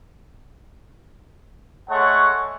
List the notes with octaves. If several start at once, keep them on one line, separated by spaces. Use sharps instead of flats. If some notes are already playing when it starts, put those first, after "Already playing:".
G#3 A3 C#5 F#5 A5 C#6